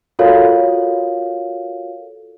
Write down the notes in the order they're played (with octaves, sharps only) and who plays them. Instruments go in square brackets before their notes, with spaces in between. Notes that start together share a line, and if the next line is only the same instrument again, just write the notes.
[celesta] F4 F#4 A4 A#4 C#5 F5